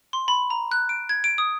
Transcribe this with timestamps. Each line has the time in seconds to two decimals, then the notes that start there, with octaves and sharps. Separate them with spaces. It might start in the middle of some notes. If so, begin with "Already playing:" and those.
0.13 C6
0.28 B5
0.50 A#5
0.71 F#6
0.89 D7
1.09 G#6
1.24 D7
1.38 D#6